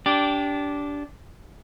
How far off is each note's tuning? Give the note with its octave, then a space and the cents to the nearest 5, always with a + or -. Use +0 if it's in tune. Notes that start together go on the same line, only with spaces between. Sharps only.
D4 -20 G4 -5